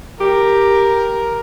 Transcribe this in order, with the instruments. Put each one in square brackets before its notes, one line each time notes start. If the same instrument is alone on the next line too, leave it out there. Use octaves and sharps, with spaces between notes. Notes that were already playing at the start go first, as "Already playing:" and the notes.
[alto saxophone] G4 [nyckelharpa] A#4